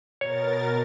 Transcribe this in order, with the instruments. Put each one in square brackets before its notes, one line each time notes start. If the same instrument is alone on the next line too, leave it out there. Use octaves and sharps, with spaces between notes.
[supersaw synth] B2 A#4 A6 [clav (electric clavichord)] C#5